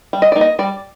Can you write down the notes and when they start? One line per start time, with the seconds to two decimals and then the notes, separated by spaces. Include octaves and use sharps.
0.13 G3
0.22 D#5
0.32 A#3 D#4 D5
0.41 D#5
0.59 G3 D5